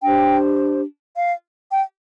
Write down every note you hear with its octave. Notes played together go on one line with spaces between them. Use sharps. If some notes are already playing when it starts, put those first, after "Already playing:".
D4 G4 C5 G5
F5
G5